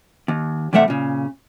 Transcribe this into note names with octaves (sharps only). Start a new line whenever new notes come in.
D#2
E2 C3 G3 A3 E5 F#5
A#2 C#3